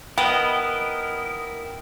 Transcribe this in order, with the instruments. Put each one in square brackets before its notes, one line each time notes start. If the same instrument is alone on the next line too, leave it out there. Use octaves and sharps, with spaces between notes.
[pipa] B3 [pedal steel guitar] E4 A#4 D#5 [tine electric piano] G5